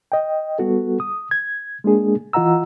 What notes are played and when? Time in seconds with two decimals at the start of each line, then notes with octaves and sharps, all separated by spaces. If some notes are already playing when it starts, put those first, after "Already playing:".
0.12 D#5 G5
0.59 G3 B3 F#4 A4
1.00 D#6
1.31 G#6
1.84 G#3 A#3 D4 G#4
2.33 E3 F4 D#5 F#5 A#5 E6